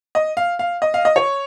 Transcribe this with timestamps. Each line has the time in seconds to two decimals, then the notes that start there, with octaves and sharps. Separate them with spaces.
0.15 D#5
0.37 F5
0.59 F5
0.82 D#5
0.94 F5
1.05 D#5
1.16 C#5